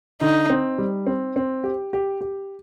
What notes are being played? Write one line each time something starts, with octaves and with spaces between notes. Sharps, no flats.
D3 D#4
C4
G3
C4
C4
G4
G4
G4